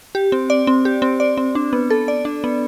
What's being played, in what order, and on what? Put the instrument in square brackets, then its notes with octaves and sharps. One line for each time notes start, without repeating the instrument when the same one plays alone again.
[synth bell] G4
C4
D5
C4
G4
C4
D5
C4
D4
B3
A4
D5
D4
B3